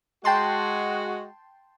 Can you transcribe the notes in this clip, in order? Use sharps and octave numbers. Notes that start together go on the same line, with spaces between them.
G#3 F#4 G5 A5 C6